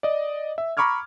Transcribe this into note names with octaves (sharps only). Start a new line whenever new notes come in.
D5 D#5
E5
A#5 B5 C#6 D6 F6 G#6